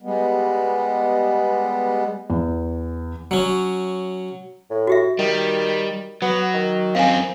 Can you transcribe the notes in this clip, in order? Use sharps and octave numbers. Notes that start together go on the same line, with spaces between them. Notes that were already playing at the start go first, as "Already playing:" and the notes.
G3 G#3 B3
E2
F#3 C#4
A2
F#4 G4 E5
D#3 G3
F#3 B3
D#3
F#2 C4 F5 G#5